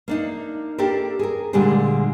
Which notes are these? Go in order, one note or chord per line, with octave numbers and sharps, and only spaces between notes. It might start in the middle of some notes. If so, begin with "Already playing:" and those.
A#3 D4 D#4
A#3 D4 G4 A4 A#4
G#4 A#4
A#2 D3 G3 G#3 G4 G#4